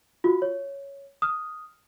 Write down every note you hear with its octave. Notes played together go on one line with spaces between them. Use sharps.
F4 F#4
C#5
D#6 F6